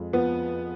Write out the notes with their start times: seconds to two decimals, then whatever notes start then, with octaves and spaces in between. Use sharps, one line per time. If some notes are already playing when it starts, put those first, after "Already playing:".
Already playing: F2 G#3
0.13 F3 B3